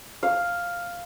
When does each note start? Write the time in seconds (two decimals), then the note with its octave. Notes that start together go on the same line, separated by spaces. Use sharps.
0.23 F5